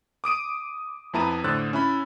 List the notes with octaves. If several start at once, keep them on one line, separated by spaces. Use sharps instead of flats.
D6 D#6 D7 D#7
F2 B3 E4 A5 A#5 D#7
A2 D3 C5 E6 F#6 A6
C#4 E4 B5